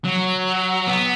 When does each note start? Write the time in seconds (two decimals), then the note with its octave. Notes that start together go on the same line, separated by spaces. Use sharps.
0.05 F#3
0.87 B3